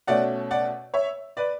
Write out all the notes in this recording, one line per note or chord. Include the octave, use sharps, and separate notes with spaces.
B2 A3 C#4 D5 F#5
D5 F#5
C#5 E5
B4 D5